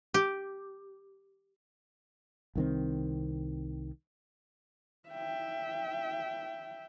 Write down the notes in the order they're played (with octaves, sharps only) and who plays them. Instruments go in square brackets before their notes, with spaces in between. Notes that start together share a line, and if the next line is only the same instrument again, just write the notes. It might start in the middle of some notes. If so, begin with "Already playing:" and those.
[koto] G4
[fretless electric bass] C2 D#3 C4
[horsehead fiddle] E5 G5